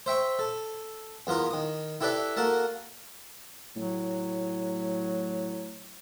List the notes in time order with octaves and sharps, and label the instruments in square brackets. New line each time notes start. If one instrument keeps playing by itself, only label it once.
[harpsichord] C5 E5 G5 C#6
A4
E2 B3 F4 A#4 D#6
D#3 D#6
E4 G4 A4 B4 D5 E5
A#3 F#4 A4 A#4 A5
[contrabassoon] A2 [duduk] F#3